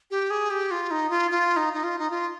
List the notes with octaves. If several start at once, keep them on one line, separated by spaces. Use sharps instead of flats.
G4
G#4
G4
F4
D#4
F4
F4
D#4
D#4
F4
D#4
F4